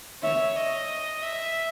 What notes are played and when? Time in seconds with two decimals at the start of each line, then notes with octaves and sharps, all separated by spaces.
0.23 C#5 E5
0.56 D#5
1.22 E5